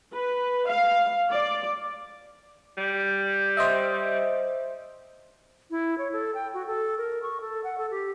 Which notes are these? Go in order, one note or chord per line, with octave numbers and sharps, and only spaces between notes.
B4
F5
D5
G3
C5 D#5 E5
E4
C#5
A4
G5
F#4
A4
A#4
C#6
A4
F#5
A4
G4